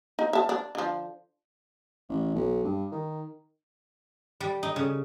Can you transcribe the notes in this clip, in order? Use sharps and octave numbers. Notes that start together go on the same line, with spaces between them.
D#4
E5 A5
D4
D3 F3
A1
B1
G2
D#3
G3
D#4
C#3